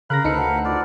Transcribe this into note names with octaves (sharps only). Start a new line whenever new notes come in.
C#3 A#4 F5 B5 C6 F#6 A#6
D2 D#4 A4 B4 C5 C#7
F#5
F4 D5